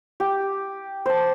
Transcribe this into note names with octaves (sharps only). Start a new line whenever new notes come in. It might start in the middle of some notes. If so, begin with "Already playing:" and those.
G4
C5 A5